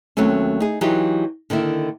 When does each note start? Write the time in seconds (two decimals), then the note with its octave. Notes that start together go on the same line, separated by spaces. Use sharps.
0.17 D#2 F#3 A3 C4 C#4
0.60 D#4 G#4
0.81 E3 F#3 D#4 F4 G4 G#4
1.50 D3 D#3 A#3 E4